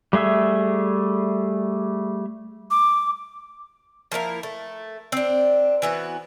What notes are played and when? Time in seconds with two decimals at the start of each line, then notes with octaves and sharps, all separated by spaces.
0.13 G3 A3 G#4 E5 E6
2.71 D6
4.12 F3 A#3 E4 A#4
4.43 A3
5.12 C4 D4
5.82 E3 B3 F#4